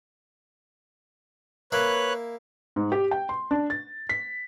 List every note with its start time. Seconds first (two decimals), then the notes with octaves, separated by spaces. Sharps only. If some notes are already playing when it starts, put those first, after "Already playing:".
1.72 A#3 E4 B4 C#5 F#6
2.76 G#2
2.92 G4
3.11 G5
3.29 C6
3.51 D4
3.70 A6
4.09 B6